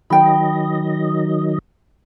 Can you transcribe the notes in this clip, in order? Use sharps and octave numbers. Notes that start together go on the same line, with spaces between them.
D#3 F#3 D#5 G5 B5